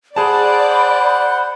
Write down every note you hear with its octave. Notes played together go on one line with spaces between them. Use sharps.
G#4 C5 D5 F#5 A5 B5